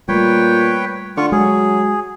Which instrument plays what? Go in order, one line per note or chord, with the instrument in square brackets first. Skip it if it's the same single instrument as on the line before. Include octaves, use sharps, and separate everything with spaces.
[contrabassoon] A#2 [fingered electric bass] G3 A3 [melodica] B4 C#5 G5
[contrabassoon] D3 [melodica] F4 C#6
[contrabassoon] F#3 [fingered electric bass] G#3 [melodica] G#4